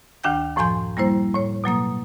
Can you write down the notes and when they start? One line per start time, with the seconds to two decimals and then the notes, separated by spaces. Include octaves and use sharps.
0.24 D2 D#3 D4 G5 G6
0.56 F#2 A2 F3 G#5 C6 G6
0.97 G3 A#3 E4 C5
1.34 A2 C#5
1.64 B2 F#3 A#3 D#6